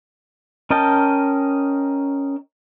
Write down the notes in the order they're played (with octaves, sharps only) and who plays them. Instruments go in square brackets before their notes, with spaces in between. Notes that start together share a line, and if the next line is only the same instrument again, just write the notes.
[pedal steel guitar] C#4 A#4 D#5 G5 A5